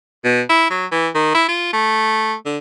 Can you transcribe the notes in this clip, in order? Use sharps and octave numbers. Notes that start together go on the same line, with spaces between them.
B2
E4
F#3
E3
D#3
E4
F4
A3
D3